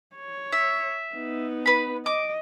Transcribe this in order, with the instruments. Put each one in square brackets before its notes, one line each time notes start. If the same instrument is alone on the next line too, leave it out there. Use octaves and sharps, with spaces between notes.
[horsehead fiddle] C#5
[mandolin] E5
[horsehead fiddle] B3 D#4
[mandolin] B4 B5
[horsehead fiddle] D#5 [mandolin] D6